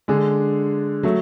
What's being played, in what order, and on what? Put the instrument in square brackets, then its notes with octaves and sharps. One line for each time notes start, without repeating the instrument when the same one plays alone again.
[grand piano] D3 G#3 D4 G#4
F#3 A3